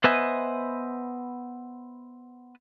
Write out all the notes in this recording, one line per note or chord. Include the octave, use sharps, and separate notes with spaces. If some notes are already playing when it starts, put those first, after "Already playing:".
B3 B4 C5 D#5 E5 G#5